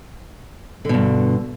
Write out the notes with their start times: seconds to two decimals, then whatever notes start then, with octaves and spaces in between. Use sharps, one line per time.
0.85 D3
0.89 B2
0.94 G2